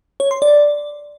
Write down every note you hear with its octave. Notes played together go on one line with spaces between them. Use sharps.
C#5
C6
D5